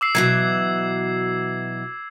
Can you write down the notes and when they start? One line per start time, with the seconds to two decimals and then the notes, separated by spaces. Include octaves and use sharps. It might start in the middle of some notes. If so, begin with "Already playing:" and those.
0.01 D6 E6 C7
0.15 B2 E3 F#3 G#6 C7